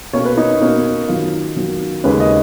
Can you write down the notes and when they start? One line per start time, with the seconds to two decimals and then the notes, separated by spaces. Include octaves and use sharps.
0.13 B2 A#3 C#4 C#5
0.25 B4
0.37 D#4
0.61 B2 A#3 C#4
1.08 F#2 D#3 F#3 A#3 F4
1.56 F#2 D#3 F#3 A#3
2.04 D#2 C#3 G#3 C#4 B4
2.20 D#5